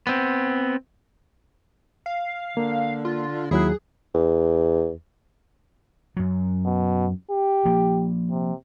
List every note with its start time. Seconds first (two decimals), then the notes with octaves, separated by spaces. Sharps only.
0.07 B3 C4
2.06 F5
2.57 D3 A#3
3.05 F4
3.51 D#2 F#3 E4 G#4 F#6
4.14 E2
6.17 F#2 F#3
6.65 B2
7.31 G4
7.65 F3 A#3
8.30 C3